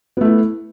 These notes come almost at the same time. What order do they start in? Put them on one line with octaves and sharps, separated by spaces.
B3 A3 E4